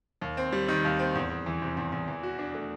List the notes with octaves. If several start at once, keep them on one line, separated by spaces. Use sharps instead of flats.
D#2
C4
G3
D#3
D#2
C4
E2
E2
E3
C3
E2
E2
E3
F#4
D4
A3